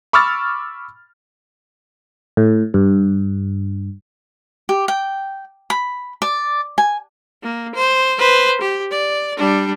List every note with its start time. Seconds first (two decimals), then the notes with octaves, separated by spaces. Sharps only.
0.13 B5 C#6 D6 E6 F6 A6
2.37 A2
2.74 G2
4.69 G4
4.88 G5
5.70 B5
6.22 D5
6.78 G#5
7.42 A#3
7.75 C5
8.19 B4 C5
8.61 G4
8.91 D5
9.37 G3 D4